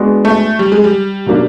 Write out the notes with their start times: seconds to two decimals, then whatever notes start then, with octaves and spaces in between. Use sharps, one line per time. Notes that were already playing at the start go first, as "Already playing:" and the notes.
Already playing: G#3 B3 D4 F#4
0.25 A3
0.59 G3
0.72 G#3
0.84 G3
1.26 B2 F#3 A#3 D4